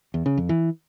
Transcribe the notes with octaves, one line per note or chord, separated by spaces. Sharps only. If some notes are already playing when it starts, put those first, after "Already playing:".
E2
C#3
F2
E3